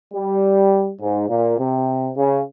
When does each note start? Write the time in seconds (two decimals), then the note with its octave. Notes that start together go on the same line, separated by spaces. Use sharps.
0.14 G3
1.01 G#2
1.29 A#2
1.59 C3
2.16 C#3